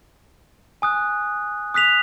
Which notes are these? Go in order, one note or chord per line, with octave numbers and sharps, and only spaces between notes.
G#5 D#6 F#6
D#6 F#6 B6 F7